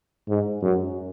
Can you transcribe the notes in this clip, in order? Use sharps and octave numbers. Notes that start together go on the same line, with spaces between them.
G#2
F#2